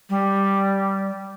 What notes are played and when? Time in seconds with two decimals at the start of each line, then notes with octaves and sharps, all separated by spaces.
0.09 G3